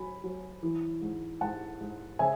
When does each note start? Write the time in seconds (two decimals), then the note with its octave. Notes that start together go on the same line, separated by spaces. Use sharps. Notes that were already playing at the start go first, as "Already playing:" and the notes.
Already playing: F#3 G#5 B5
0.24 F#3
0.63 E3
1.02 G#2
1.41 G#2 F#5 A5
1.80 G#2
2.19 C#3 E5 G#5